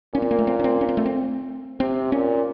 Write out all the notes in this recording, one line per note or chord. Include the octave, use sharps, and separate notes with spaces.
A#2 C#4
C4
A#3
A3
C4
C#4
C4
C#4
C4
A3
C4
C3 C4
A#2 C#4